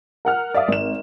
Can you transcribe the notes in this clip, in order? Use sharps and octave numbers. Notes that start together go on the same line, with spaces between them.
A#4 F#5 F6
D5 E5 F5 D#6
G#1 E7